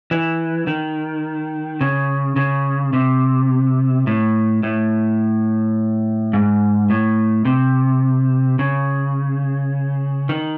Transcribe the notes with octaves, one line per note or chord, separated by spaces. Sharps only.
E3
D#3
C#3
C#3
C3
A2
A2
G#2
A2
C3
C#3
D#3